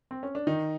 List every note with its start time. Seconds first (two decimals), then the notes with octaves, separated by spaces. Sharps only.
0.11 C4
0.23 C#4
0.35 D4
0.47 D#3 D#4